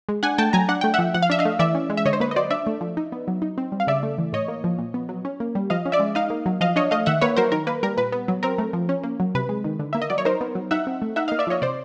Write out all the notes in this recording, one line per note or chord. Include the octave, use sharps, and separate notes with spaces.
G#3
D4 F#5 G#5
A3 G5 A5
F#3 G#5 A#5
D4 F#5
A3 G5
F3 E5 F#5
F3 F#5
F5
D4 E5
D#5 F5
A3
E3 D5 E5
C#4
G#3
E5
D3 C#5 D#5
C5
A#3 B4
D#5
F#3 C5 D5
D4 D5 E5
A3
F3
D#4
B3
F#3
D#4
C4
G3
F5
C#3 D5 E5
A3
E3
A2 C#5 D#5
A#3
F3
A#2
B3
F#3
C#4
A#3
G3
F3 D#5 F5
C#4
D5 E5
G#3
D#4 D#5 F5
A#3
F#3
F3 D#5 F5
D4 C#5 D#5
A3 D#5 F5
D#3 E5 F#5
A#3 B4 C#5
F#3 A#4 C5
D#3 A#4
A#3 B4
G3 A#4
A#2 B4
B3
F#3
C4 A#4
A3
F3
C#4
A#3
F#3
C3 B4
G#3
D#3
D3
A#3 E5
D#5
F#3 D5
C#5
D#4 A#4 C5
B3
F#3
D#4 E5 F#5
C4
A3
D#4 E5 F#5
D#5 F5
A#3
D5 E5
F3 C#5 D#5
C3 C5 D5